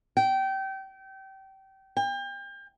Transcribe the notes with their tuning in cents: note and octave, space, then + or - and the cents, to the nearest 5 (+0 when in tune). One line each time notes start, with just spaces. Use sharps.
G5 -25
G5 +35